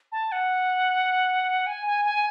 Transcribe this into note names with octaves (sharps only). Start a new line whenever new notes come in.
A5
F#5
G#5
G#5
G#5